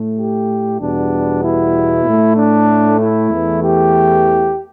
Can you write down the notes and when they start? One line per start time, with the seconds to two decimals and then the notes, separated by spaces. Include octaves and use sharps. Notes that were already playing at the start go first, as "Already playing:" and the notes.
Already playing: A2 A3
0.18 G4
0.80 E2 B2 G3 B3 D4
1.43 E4
2.06 A2 A3
2.37 D4
2.99 E4
3.30 E2 E3 A3
3.62 G4